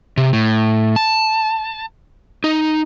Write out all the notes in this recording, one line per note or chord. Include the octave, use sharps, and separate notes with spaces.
C3
A2
A5
D#4